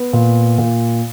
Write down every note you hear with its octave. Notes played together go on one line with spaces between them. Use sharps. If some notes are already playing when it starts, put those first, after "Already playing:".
Already playing: B3
A#2
A#2